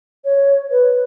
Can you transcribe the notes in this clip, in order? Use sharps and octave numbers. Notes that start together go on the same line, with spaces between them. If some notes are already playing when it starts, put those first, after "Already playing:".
C#5
B4